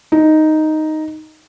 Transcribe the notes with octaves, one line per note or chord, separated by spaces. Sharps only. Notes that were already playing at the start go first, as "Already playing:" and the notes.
D#4